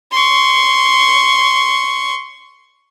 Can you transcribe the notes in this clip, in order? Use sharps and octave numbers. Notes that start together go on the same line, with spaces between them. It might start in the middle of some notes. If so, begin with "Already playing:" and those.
C6 C#6